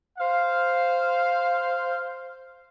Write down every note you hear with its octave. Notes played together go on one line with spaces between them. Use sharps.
C5 F5